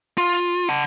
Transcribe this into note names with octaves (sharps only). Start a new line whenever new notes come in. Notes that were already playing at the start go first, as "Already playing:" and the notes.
F4
F#5 A5